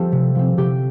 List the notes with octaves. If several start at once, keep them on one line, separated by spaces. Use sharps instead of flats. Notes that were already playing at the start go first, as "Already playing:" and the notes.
Already playing: F3 C4 G4 A4
C3
F3 C4
C3 G4